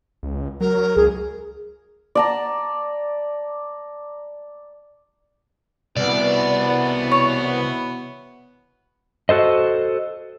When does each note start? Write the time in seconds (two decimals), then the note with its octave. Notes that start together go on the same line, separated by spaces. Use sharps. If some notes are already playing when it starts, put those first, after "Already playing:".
0.23 C#2
0.61 F#3 A#4
0.96 C#2 G#4
2.15 D5 A5 A#5
5.97 C2 B2 E3 B3 D5
7.12 C#5
9.29 F#4 A4 C5 D#5